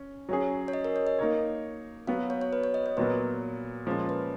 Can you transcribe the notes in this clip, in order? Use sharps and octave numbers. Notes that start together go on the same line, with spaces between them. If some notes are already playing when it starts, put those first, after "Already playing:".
Already playing: C#4
F#3 C#4 G#4
C#5
D#5
A#4
C#5
D#5
A#3 D#4 A#4 C#5
F#3 B3 F#4 F5
C#5
C#5
B4
C#5
D#5
C#5
A#2 F#3 B3 B4
A#2 F3 G#3 C#4
B4